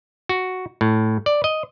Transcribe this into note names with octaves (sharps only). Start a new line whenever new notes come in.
F#4
A2
D5
D#5